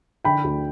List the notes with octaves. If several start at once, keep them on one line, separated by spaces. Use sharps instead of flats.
D3 G5 B5
D2